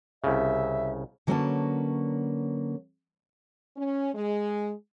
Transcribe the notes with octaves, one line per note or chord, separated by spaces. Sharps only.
C2 C#3 E5
D3 F#3 A#3 C#4 B4 A5
C#4
G#3